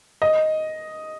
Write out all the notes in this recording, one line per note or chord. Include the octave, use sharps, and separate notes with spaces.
D#5